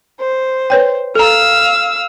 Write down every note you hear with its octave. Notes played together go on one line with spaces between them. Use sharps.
C5
B4 C#5 G5
A4 F5 A#5 E6 F6